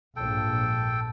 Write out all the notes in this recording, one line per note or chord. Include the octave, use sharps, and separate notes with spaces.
A#1 G#2 A4 G5